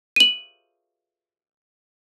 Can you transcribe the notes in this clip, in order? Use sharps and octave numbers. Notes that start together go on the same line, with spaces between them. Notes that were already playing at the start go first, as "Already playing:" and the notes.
D#7 F#7